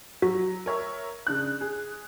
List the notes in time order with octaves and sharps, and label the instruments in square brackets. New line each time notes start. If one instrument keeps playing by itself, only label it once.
[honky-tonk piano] F#3 [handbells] F#4
[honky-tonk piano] A#4 C#5 E5
C#3 D4 F#6
G#4